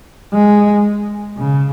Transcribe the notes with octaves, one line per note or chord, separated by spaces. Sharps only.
G#3
C#3